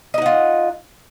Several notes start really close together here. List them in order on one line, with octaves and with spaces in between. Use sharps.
D#5 D#4 F#5 F4